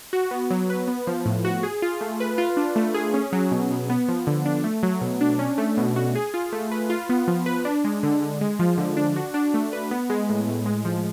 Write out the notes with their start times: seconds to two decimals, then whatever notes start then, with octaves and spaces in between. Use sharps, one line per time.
0.13 F#4
0.31 B3
0.50 F#3
0.70 B4
0.87 B3
1.07 F3
1.26 A2
1.45 F#4
1.63 G#4
1.82 F4
2.01 A3
2.20 B4
2.38 F4
2.57 D4
2.76 A3
2.94 G#4
3.14 C#4
3.32 F#3
3.51 B2
3.71 B2
3.90 B3
4.08 F3
4.27 D3
4.46 D4
4.64 A3
4.83 F#3
5.01 B2
5.21 D4
5.39 C#4
5.58 A3
5.77 B2
5.96 F#4
6.15 G#4
6.34 F4
6.52 A3
6.71 B4
6.90 F4
7.09 B3
7.28 F3
7.46 B4
7.65 D4
7.84 G#3
8.03 D3
8.22 D3
8.41 G#3
8.59 F3
8.78 D3
8.97 D4
9.16 F#4
9.34 D4
9.54 A3
9.73 B4
9.91 B3
10.10 G#3
10.29 A2
10.48 A2
10.66 G#3
10.85 F3